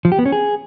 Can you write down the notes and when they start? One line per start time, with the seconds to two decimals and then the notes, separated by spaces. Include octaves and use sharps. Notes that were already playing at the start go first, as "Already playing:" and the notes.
0.05 F3
0.12 G4
0.19 B3
0.26 C#4
0.32 G#4